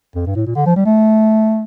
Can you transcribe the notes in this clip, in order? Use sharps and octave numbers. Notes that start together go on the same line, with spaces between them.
F2
G2
A2
A#2
D3
F3
G3
A3